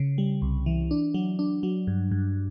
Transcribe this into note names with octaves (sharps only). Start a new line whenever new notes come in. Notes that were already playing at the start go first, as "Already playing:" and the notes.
Already playing: C#3
G3
C2
E3
D4
F#3
D4
F#3
G2
G2